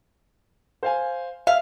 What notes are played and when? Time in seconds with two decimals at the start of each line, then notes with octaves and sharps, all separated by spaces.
0.83 C5 F5 G#5
1.47 E5 F5